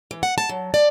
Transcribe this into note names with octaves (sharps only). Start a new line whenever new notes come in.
E3
F#5
A5
F#3
D5